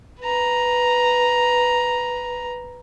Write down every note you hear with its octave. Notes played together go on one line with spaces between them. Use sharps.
B4 A#5